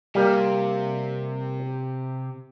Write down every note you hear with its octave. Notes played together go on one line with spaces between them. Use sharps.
C3 G3 A#3